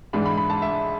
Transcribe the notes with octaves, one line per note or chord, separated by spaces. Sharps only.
G#2 E3 G#3 D4 B5
B5
B5
A5
E5